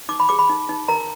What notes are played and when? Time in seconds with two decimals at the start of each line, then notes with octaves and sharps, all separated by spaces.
0.09 D#4 D6
0.20 B5
0.29 G#4 D6
0.39 B5
0.50 D#4
0.69 D#4
0.88 A#4 A#5